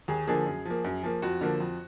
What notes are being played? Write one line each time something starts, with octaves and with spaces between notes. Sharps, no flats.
D#2 G#4
D3 F3 A#3 G#4
F#2
F3 A#3
F#2
F3 A#3
F2 F#4
D3 F3 A#3
F2